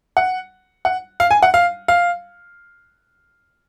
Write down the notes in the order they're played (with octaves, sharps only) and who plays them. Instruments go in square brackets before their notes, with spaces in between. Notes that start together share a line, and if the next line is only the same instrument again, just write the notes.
[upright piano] F#5
F#5
F5
G#5
F#5
F5
F5